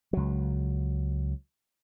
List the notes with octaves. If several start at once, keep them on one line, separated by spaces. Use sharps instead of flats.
C#2 F#3